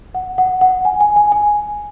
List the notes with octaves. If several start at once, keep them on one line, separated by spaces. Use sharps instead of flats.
F#5
F#5
F#5
G#5
G#5
G#5
G#5